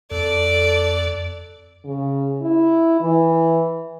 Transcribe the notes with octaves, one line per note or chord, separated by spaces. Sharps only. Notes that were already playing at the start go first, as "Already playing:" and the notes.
F2 A4 D5
C#3
E4
E3